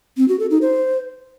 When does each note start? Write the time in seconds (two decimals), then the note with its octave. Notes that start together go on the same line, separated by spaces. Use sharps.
0.17 C4
0.28 F#4
0.39 A4
0.51 D#4
0.62 C5